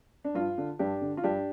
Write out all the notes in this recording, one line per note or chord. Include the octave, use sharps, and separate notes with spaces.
D4
G2 F4
D3
G2 D4 G4
D3
F4
G2 D4 G4